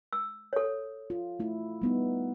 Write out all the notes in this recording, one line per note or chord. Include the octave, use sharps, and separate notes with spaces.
E6
A4 C#5
F4
A3 E4
G3 B3 D#4